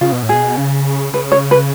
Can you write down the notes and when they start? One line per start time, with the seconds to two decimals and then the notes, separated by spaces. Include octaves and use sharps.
0.01 C#3 F4
0.12 B2
0.22 A2
0.29 B2 G#4
0.57 C#3
1.13 C#3 B4
1.32 C#5
1.51 B4